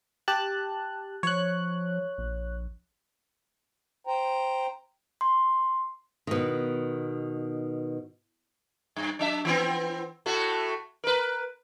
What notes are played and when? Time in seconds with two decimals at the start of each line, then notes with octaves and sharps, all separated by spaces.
0.28 G4 A5 F#6
1.23 F3 C#5 F#6
2.18 A#1
4.07 C5 G5 A#5
5.21 C6
6.27 B2 D#3
8.96 G2
9.19 F#3 D4 E5
9.45 E3 B3 C4
10.26 A2 A3 F#4
11.04 A#4 B4